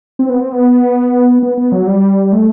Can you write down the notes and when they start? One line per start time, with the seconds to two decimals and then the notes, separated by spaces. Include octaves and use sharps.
0.19 C4
0.30 B3
0.40 C4
0.52 B3
1.43 B3
1.58 B3
1.72 F#3
1.87 G3
2.33 A3